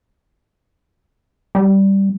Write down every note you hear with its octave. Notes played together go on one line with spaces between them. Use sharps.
G3